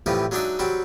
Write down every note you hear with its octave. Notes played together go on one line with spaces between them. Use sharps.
A2 C3 E3 F3 G3
F#3 G#3 D4 D#4 D5 E5
F#3 G3 C4 F#4